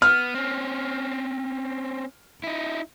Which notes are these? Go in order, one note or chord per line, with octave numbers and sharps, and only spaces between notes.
B3 F6
C4 C#4
D#4 E4